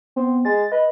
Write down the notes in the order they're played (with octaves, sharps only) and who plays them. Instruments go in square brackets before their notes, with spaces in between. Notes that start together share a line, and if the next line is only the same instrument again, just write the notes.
[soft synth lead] B3 [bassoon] C4
[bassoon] G#3 [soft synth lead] A6
[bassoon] B4 [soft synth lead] D#5